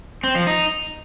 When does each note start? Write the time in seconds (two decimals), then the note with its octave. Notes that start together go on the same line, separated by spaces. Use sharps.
0.24 C4
0.35 F3
0.47 D#4